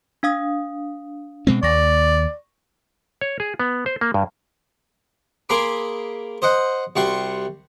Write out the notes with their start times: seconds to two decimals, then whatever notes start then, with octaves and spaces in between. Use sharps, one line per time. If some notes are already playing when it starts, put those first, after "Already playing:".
0.23 D4 F5 D#6
1.47 B2 G#3 C4
1.63 D#2 D5 C#6 A#6
3.21 C#5
3.40 G#4
3.60 B3
3.86 C5
4.01 A#3
4.14 G2
5.49 A#3 G#4 A#4 B5 C6 D6
6.42 C5 D#5 F#5
6.96 C2 G3 F#4 C6 C#6